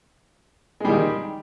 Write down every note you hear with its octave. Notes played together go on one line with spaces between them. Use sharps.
D#3 G3 G#3